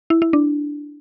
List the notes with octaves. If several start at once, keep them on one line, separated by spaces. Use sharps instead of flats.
E4
E4
D4